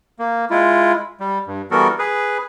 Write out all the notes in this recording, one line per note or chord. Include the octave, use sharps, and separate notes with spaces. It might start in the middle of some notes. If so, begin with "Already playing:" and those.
A#3
G#3 E4 F4
G3
G2
E3 G3 B3 F#4 A4 A#4
G#4 B4